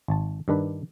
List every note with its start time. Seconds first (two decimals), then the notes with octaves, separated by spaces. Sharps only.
0.08 G#1 A5
0.48 G2 D#3 D4 B4